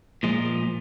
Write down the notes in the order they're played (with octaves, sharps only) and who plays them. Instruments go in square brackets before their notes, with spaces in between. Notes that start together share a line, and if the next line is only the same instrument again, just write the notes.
[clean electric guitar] A#2 F3 G#3